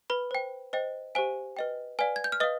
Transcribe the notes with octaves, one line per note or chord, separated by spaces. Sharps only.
B4 B5
C5 G5
C5 D#5 G5
G4 C5 F5 G#5
B4 D#5 G5
B4 D5 F5 G#5
G#6
G6
F6
B4 D#5 F5 D#6